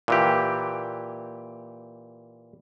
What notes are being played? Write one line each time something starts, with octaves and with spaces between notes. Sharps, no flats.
A#2 E3 G4